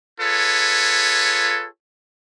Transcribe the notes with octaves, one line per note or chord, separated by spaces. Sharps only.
F4 G#4 A4 B4 C#5